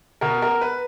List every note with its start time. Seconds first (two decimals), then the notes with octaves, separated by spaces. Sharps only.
0.21 B2 A#4
0.42 A#4
0.61 B4